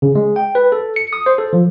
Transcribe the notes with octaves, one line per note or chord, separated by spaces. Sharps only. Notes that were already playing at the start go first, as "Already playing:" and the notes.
C#3
G#3
G5
B4
A4
C#7
D#6
C5
A4
F3